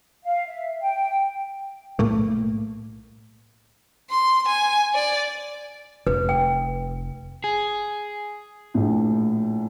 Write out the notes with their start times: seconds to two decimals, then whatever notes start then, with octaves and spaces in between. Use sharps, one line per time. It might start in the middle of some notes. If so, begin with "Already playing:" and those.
0.24 F5
0.47 E5
0.80 G5
1.99 B1 A2 A3 A#3
4.10 C6
4.48 G#5
4.94 D5
6.07 F1 B4
6.29 G5
7.44 G#4
8.74 A#1 A2